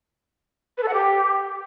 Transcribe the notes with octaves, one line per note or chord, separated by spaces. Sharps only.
B4
A4
F#5
G4